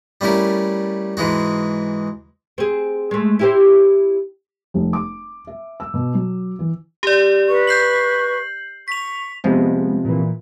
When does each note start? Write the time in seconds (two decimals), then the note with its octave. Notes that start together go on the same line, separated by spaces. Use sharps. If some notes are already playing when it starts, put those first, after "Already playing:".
0.21 G3 A3 C#4 E4 A#4
1.17 G#2 E3 G#3 F#4
2.58 C4 G#4
3.11 G#3 A3
3.39 E4 G4 C5
4.74 F1
4.93 D6
5.47 E5
5.80 E6
5.94 B2
6.14 F#3
6.59 E3
7.03 G4 D5
7.48 B4 C#6
7.67 G6 C7 F#7
8.88 C#6 B6 F7
9.44 F2 C3 F3 G#3 B3
10.04 A#2 E3